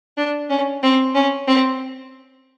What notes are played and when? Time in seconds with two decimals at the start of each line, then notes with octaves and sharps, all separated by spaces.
0.17 D4
0.50 C#4
0.83 C4
1.15 C#4
1.47 C4